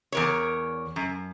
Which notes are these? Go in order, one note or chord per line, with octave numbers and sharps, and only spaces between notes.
E2 A#4 C#5
F#2